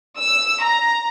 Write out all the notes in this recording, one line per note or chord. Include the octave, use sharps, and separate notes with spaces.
E6
A#5